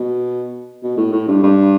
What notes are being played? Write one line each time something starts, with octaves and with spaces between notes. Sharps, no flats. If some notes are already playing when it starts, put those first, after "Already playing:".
Already playing: B2
B2
A2
A2
G2
G2